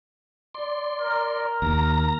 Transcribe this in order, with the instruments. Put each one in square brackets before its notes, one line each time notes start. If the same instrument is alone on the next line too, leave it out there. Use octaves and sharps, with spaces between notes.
[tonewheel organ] D5 C6
[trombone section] A#4
[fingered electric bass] D#2 [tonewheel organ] A#5